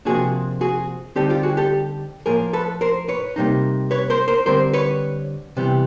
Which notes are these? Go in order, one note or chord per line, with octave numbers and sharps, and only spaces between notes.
C3 F3 A#3 D4 F#4 G#4
F#4 G#4
D3 G3 C4 D#4 G4 A4
F4 G4
F#4 G#4
G4 A4
A2 F3 A#3 G#4 A#4
A4 B4
A#4 C5
B4 C#5
C3 E3 G3 A#3 D#4
B4 C#5
A#4 C5
A#4 C5
D3 G3 C4 A#4 C5
B4 C#5
C3 E3 G3 B3